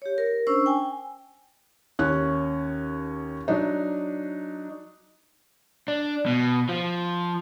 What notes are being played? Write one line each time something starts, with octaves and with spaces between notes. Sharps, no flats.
G4 C#5
A#4
C#4 D4 C5 C#6 E6
G5 G#5
D#2 C#4 F#6
F#3 D4 D#4
D4
B2
F3